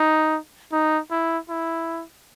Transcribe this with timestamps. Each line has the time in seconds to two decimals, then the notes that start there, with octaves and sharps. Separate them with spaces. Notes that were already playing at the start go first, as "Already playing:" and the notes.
Already playing: D#4
0.72 D#4
1.11 E4
1.49 E4